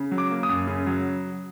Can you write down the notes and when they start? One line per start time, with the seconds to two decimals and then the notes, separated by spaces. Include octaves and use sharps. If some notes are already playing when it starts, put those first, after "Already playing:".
Already playing: C#3
0.11 F#3
0.18 D6
0.31 A#3
0.43 D#6
0.49 F#2
0.67 C#3
0.87 F#3